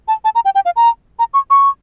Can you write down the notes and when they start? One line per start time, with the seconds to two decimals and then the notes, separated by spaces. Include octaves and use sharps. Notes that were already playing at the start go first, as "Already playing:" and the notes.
0.08 A5
0.24 A5
0.35 A#5
0.45 G5
0.55 G5
0.65 F5
0.76 A#5
1.19 A#5
1.34 C#6
1.50 C#6